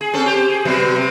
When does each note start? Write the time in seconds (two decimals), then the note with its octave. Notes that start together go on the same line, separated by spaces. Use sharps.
0.01 G#4
0.13 C4 C#4 A4
0.26 G4 C5
0.49 G#4
0.65 C3 F#3 B3
0.96 C3